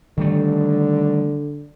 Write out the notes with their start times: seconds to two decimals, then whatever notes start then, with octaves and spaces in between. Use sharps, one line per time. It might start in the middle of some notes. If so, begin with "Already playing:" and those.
0.17 D3 D#3 G3 A3